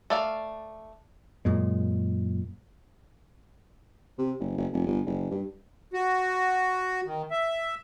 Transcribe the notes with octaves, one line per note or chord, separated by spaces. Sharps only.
A3 D5 F5
F#2 A#2 G#3
C3
F#1
F#1
F1
G1
F#1
G2
F#4
D#3
E5